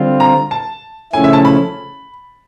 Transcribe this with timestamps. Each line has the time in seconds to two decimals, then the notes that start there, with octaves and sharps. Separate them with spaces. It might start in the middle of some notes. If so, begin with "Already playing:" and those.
Already playing: D3 G3 C4 F4
0.20 A#5
0.51 A5
1.13 C#3 F3 A3 C#4 E4 G#5
1.24 E5
1.33 A5
1.45 B5